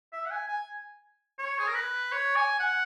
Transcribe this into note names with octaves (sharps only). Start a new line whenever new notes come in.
E5
F#5
G#5
G#5
C#5
G#4
A#4
B4
C#5
G#5
F#5